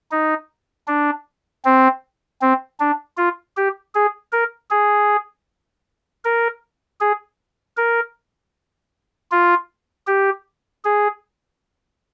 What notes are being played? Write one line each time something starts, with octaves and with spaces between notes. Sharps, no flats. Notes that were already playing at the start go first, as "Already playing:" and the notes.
D#4
D4
C4
C4
D4
F4
G4
G#4
A#4
G#4
A#4
G#4
A#4
F4
G4
G#4